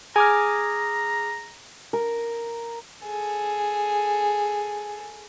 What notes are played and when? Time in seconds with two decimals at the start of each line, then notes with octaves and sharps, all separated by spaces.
0.16 G#4 G#5 A#5 D6 F6
1.93 A#4
3.04 G#4 A4